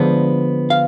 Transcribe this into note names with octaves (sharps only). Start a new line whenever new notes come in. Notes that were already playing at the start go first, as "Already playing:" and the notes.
Already playing: D3 F3 G#3 B3 D5
F5